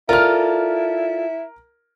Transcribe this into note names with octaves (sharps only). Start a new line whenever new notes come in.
E4 F4 A4 A#4 D5 F6